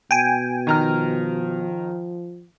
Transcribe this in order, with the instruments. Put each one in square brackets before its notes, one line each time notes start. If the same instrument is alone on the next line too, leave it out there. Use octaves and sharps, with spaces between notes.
[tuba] B2 [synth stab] G5 G#5
[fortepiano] D#3 A#5 F6 [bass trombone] F3